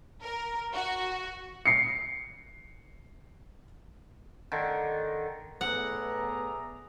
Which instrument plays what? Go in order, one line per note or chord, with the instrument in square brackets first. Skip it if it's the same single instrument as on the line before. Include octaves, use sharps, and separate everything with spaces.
[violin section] A#4
F#4
[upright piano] C7 C#7
[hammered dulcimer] D3 D#3
[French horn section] A2 A3 B3 [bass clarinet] G#4 [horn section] D5 E5 A#5 [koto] F#5